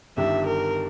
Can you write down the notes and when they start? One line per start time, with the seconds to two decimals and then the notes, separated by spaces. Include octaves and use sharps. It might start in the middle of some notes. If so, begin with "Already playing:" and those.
0.17 G1 G2 D#3 G3 E5
0.46 A#4